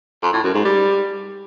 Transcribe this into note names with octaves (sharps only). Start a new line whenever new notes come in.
F2
A2
F#2
G#2
G3